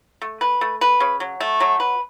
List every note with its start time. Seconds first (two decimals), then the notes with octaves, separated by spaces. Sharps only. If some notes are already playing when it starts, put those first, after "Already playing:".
0.22 A3
0.41 B4
0.61 A3
0.81 B4
1.00 C#3
1.20 F#3
1.40 A3
1.60 F#3
1.80 B4